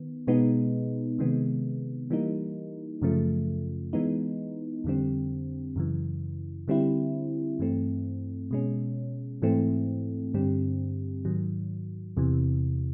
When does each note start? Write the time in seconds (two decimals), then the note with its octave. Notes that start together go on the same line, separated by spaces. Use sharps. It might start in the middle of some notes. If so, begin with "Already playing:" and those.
Already playing: D#3 B3
0.27 B2 G#3 B3 D#4
1.18 C3 D#3 G#3 B3
2.10 E3 G3 A#3 D#4
3.02 F#2 C#3 F3 A3
3.93 E3 G#3 B3 D#4
4.84 F2 D3 G3 C4
5.76 F#2 C#3 E3
6.68 D3 G3 C4 E4
7.59 G2 E3 A3 C4
8.51 B2 G#3 C#4
9.42 G#2 E3 A3 C4
10.34 G2 D3 G3 C4
11.25 G#2 D#3 F#3
12.17 E2 C3 E3